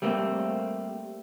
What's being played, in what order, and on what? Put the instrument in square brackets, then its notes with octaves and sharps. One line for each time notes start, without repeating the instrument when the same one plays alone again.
[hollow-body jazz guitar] G3 A3 A#3 C4